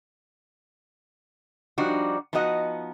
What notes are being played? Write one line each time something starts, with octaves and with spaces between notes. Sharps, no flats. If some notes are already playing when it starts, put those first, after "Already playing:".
F3 G3 D4 D#4 F#4
F3 B3 D#4 F#4 D#5 F#5